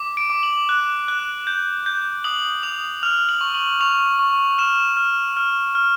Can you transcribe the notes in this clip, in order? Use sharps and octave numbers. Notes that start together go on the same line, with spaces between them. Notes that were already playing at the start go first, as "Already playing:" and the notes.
Already playing: D6
D7
D6
F#7
F#6
F#6
G6
G6
D#6 F#7
D#6 F7
F6 F7
F#7
C#6
F#7
C#6 F7
C#6
F6 E7
F6
F6
F6